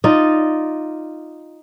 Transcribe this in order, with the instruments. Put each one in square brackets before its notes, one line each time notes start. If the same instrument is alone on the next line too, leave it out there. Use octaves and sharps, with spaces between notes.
[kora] D#4 F4 D5 D#5